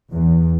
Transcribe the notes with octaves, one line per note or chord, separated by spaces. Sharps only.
E2